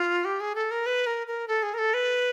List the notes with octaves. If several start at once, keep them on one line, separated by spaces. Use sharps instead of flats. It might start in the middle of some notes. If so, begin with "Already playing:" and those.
Already playing: F4
G4
G#4
A4
A#4
B4
A#4
A#4
A4
G#4
A#4
A4
B4